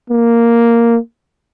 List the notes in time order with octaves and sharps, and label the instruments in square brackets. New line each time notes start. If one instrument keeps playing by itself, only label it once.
[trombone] A#3